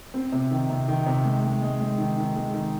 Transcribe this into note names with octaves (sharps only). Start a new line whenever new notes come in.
C4
C3
D#3
C3
D#3
C3
G#3
G#3
G#3
G#3
D#3
D#3
G#3
D#3